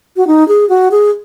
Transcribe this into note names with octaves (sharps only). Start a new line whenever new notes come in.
F#4
D#4
G#4
F#4
G#4